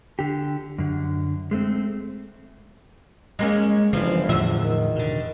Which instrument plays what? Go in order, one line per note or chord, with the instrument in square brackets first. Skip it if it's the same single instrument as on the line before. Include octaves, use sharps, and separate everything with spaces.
[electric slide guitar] D3 G4
F#2 D3
G#3 A3 C4
[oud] G#3 A#3 C#4
[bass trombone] G1 [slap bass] C#3 E3 [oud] F3
[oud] E2 E5 [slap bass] A2 D3 F3
[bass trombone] D#3
[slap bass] B2 D3